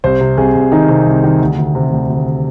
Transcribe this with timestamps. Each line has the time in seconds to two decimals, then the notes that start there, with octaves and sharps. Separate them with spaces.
0.04 C2 C5
0.21 C3
0.37 C2 G#4
0.55 C2
0.72 D#3 D#4
0.89 C3
1.06 C2
1.24 D#3
1.41 D2
1.58 D2
1.75 C3
1.93 D2
2.10 D2